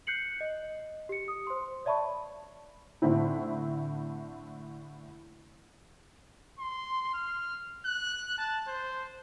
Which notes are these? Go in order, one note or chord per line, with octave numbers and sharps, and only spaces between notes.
F#6 G6 C7 C#7 F#7
D#5
G4 C#7
D#6
C5 C6
C#5 D5 E5 A5 B5 C#6
A2 D3 C4 E4
C6
F6
F#6
A5
C5